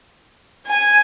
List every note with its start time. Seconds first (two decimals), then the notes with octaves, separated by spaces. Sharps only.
0.67 G#5